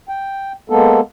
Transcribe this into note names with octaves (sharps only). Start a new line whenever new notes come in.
G5
G#3 A#3 B3 A4